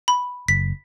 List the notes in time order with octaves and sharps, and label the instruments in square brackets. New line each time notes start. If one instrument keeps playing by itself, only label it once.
[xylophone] B5
[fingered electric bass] F#1 [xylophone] B6